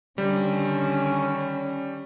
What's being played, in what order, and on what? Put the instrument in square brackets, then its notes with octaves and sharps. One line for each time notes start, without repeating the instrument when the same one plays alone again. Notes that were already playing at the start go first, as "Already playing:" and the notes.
[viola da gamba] D3 D#3 [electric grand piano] G3 [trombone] C#4